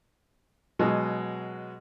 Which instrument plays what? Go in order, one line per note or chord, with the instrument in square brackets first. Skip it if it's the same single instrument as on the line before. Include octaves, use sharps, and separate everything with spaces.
[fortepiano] B2 F#3 G#3